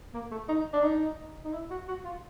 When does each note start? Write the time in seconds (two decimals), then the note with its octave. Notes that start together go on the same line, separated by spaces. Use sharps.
0.14 A#3
0.31 A3
0.49 D#4
0.73 D4
0.84 D#4
1.45 D#4
1.53 E4
1.70 F#4
1.88 F#4
2.05 F4